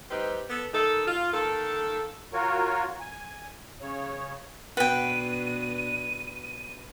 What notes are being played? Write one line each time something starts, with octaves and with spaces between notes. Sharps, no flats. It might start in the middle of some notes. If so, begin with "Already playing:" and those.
G3 C4 D#4 G4 B4
B3 A4
D#3 D#4 A4
F4
D#3 A#3 A4
F4 F#4 A#4 C#5
G#5
C#3 C#5
B2 D4 B4 F#5 G5 D#7